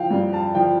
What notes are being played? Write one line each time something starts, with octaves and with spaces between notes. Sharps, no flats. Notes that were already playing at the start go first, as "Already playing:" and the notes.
Already playing: F3 F5 G5
G2
A5
F3 G5